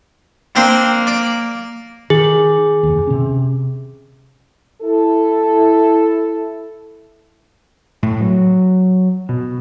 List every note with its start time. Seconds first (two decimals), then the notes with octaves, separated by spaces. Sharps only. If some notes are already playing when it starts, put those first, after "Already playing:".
0.56 A#3 C4 D4 C5
1.07 D5
2.10 D#3 G#4
2.83 F1 D#2
3.07 C3 C#4
4.82 E4 A4
8.03 A2
8.21 F#3
9.29 B2